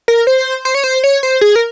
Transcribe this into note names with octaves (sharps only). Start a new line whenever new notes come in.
A#4
C5
C5
C#5
C5
C#5
C5
G#4
A#4